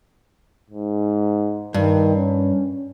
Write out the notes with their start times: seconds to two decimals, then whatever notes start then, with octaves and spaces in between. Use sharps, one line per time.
0.70 G#2
1.74 G2 D#3
2.16 C#4